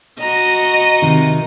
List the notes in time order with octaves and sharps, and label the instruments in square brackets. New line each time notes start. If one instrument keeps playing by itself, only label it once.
[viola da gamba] F#4 D#5 [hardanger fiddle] A#5
[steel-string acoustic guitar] C3 D#3